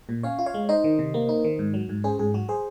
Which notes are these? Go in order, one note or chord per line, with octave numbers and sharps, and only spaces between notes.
A#2
C#4 C#5 F5
F4
C#5 F5
G#3
D#4 C5 D#5
D#3
C3
A#3
D#4
D#3
G#2
F#3
G#2
C#4 G#4 C5
G#2 G#4
F#3 F#4
G#4 C5